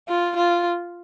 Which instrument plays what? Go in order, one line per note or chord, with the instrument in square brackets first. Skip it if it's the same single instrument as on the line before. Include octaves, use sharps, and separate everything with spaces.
[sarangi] F4
F4